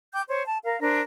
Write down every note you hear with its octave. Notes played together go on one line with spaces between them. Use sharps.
G5 D6 G6
C5 C#5
A5
A#4 F5
D4 A#4 C5